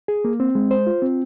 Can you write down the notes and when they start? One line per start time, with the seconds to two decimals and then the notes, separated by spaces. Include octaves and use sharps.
0.08 G#4
0.25 A#3
0.40 C4
0.55 G#3
0.71 C5
0.87 F4
1.02 C4